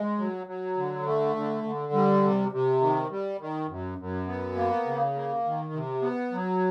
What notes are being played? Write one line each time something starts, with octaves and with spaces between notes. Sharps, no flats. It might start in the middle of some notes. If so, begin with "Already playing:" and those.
Already playing: G#3
F#3
F#3
D3
A3
D3
D3
G3
C3
C3
D#3
G3
D#3
F#2
F#2
B3
A#3
C#3
A#3
D#3
C3
B3
F#3